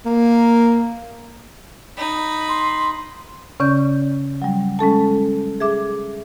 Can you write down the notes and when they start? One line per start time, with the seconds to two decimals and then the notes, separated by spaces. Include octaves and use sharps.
0.06 A#3
1.97 D#4 B5
2.49 C6
3.60 C#3 C#4 D5 G6
4.42 F#3 G3
4.79 G#3 C#4 A4 A5
5.60 G#4 E5 D6